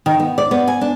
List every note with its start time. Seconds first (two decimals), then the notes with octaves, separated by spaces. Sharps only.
0.06 D#3
0.20 B3
0.38 D5
0.51 B3
0.68 G#5
0.81 D4